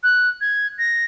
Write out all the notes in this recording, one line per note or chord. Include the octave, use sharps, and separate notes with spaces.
F#6
G#6
A#6